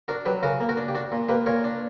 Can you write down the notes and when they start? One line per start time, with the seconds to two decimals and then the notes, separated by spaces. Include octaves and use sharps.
0.08 D4 F#4 A#4
0.26 F#3 G4 B4
0.43 C#3 F#4 A#4
0.61 A#3
0.69 F#4 A#4
0.77 D4
0.88 G4
0.95 D4 F#4
1.12 A#2
1.29 A#3 G4 B4
1.46 A#2 A#4 C#5
1.64 D4